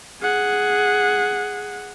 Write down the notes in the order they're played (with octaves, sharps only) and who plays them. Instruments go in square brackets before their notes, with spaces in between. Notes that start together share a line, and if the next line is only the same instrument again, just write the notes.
[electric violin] G#4 F#5